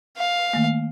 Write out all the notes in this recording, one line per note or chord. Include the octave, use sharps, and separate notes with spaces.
F5
D#3 A3 A#3